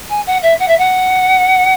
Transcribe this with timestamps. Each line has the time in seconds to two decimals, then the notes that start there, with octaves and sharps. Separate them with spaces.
0.09 G#5
0.26 F#5
0.42 E5
0.59 F#5
0.67 E5
0.77 F#5